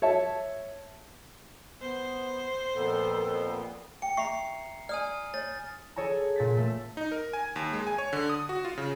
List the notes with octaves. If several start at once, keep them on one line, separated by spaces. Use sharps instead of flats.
C#5 E5 A5
B3 C5
F2 A#2 B3 A4
G5 C#7
E5 A#5 C#6 C7
D5 G#5 D#6 F6
C#5 A6
G#4 A4 C#5 A5 A#5
A#2 A6 B6
A3 A4
D#4
A#4
G#5
D#2
G#3
G#5
C#5
D3
D#6
F#4
F4
C#3